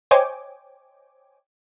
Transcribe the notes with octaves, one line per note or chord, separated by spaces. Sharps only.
C5 C#5 D#5 G5 G#5 D6